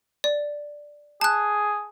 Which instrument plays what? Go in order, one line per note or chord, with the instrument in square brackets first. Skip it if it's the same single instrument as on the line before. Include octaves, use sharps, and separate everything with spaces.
[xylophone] D5
[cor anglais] G#4 [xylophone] A5 F#6